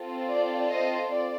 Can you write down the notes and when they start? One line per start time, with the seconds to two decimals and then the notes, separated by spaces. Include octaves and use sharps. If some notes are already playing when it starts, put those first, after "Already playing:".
Already playing: C4 F4 A4
0.29 D5
0.68 C5 D#5
1.08 D5